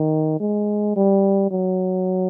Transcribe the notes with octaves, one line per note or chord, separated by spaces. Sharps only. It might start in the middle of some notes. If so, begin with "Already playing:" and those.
Already playing: D#3
G#3
G3
F#3